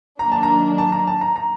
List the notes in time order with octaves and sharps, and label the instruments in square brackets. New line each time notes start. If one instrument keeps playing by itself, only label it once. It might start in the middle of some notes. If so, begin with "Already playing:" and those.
[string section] D#3 F#3 A#3 D4 [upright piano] A#5
[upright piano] A5
A#5
A5
A#5
A5
A#5
A#5